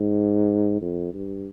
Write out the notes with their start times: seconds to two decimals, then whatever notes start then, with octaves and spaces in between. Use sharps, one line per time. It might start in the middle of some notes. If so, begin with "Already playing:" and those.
Already playing: G#2
0.82 F2
1.14 G2